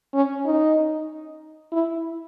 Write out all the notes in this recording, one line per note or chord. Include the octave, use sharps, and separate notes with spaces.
C#4
D#4
E4